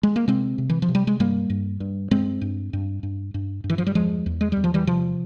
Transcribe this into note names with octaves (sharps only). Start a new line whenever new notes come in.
G#3
A#3
C3 G#3 C4
C3
E3
F3
C3
G3
G#3
G2 G3 A#3
G2
G2
G2 G#3 C4
G2
G2
G2
G2
G2
E3
F3
G3
E2 F3 G#3
E2
G#3
E2 G3
F3
E3 G3
C3 F3